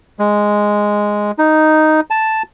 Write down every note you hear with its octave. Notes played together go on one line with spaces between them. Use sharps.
G#3
D#4
A5